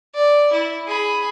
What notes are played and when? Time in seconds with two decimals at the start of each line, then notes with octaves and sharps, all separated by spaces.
0.15 D5
0.52 E4
0.88 G#4 B5